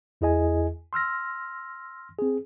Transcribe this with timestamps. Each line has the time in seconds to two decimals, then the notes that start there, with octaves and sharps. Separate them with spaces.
0.21 E2 E4 G#4 D#5 G#5
0.93 C6 E6 F6 A#6
2.18 C4 G#4